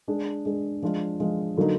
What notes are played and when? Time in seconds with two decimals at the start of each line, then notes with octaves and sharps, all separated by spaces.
0.08 G#3 D4 G#4
0.46 G#3 D4 G#4
0.82 F3 G#3 D4 F4
1.20 F3 G#3 D4 F4
1.57 D3 F#3 A#3 D#4